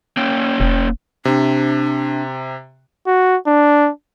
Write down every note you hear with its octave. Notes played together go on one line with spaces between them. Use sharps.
A#3 C#4 G5
E1
C3 D4
F#4
D4